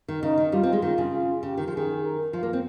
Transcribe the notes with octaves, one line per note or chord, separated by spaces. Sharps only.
D#3
C#3 D#4
D#3
G3 F4
C4
G#3
D#3 F4
C#3
F4
C#3 G4
D#3
F3
D#3 G#4
A#4
F3 F4
A#3
C4